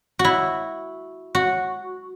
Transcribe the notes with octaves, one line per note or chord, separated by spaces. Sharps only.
F#4
E4
F#4